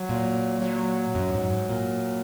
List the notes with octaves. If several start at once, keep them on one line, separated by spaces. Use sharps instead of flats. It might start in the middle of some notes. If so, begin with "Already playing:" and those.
Already playing: F#3
A#2
F#3
F#2
G#2
G#2
A#2